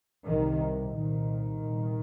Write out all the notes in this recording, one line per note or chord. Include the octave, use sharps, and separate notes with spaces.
C2 C3 D#3
C2 A#2 D#3
C2 A#2